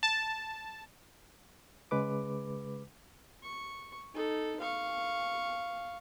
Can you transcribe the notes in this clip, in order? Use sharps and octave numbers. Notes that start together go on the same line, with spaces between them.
A5
C#3 G#3 B4 D6
C#6
D#4 A4
F5 C#6